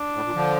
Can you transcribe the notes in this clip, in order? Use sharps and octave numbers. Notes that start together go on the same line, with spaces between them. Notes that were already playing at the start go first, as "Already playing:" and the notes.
Already playing: D4
A2
A#2
D3 F3